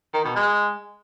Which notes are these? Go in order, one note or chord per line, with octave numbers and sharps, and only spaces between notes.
D#3
B2
G#3